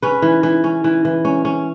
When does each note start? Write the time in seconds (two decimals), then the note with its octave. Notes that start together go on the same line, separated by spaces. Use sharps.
0.02 C#4 B4
0.22 E3
0.43 E3
0.64 C#4
0.84 E3
1.05 E3
1.25 C#4
1.45 C#4